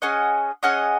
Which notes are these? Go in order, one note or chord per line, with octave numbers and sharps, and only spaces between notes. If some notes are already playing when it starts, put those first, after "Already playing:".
C#4 G#4 D#5 F#5
C#4 G#4 D#5 F#5